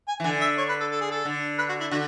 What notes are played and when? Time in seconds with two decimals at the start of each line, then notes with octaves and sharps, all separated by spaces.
0.08 G#5
0.20 E3
0.24 D3 G#5
0.41 E5
0.58 C#5
0.69 B4
0.80 A4
0.91 A4
1.01 G#4
1.11 A4
1.25 D3
1.59 B4
1.69 F#4
1.80 E4
1.91 D3 F#4